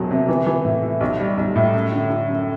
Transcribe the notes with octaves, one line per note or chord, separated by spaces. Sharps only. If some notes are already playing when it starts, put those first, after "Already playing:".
Already playing: E1 E2 F#3
C3
E3
E3
A2
E4
B1
G3
B1
A2
F#2
D3
D3
F#2